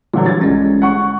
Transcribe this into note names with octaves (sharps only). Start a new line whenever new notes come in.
A#2 D3 E3 F#3 G3
G#6 A6
G1 G#3 C#4
F#5 C#6